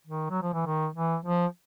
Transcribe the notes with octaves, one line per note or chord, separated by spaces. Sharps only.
D#3
F#3
F3
E3
D#3
E3
F3